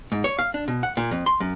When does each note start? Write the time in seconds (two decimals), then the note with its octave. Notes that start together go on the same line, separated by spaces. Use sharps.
0.12 G#2
0.24 C#5
0.39 F5
0.54 D4
0.68 B2
0.83 F#5
0.97 A#2
1.11 F2
1.26 C6
1.40 F#2